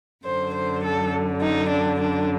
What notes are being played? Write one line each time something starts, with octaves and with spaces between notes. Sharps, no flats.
F#2 D3 C5
C5
A4
D#4
D4
D4